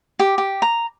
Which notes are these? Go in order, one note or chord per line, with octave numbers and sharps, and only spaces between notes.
G4
G4
A#5